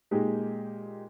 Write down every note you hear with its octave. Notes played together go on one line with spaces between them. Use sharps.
A#2 G#3 D#4 G4